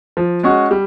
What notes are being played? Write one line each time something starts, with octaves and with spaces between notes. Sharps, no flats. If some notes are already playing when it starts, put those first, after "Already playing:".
F3
G#3 C#4 F#4
G3